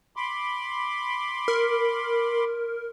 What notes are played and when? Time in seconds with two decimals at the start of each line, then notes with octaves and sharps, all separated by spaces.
0.16 B5 C6 D6
1.48 A#4